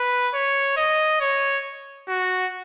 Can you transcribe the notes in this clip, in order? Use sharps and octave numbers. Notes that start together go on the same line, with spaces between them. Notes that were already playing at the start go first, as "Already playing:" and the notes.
Already playing: B4
C#5
D#5
C#5
F#4